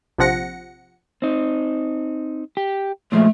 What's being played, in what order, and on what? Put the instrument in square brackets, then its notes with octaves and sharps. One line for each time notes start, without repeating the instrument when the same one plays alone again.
[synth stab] A#1 C3 F3 F#5 A#6 C#7
[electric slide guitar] C4 D#4
G4
[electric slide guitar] A#2 F3 G#3 [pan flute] A3